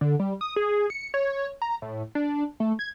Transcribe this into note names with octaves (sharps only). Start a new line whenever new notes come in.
D3
G3
D#6
G#4
C#7
C#5
A#5
A2
D4
A3
G#6